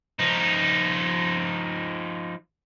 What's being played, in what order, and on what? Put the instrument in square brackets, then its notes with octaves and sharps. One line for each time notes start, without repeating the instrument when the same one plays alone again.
[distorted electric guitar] F3 D#4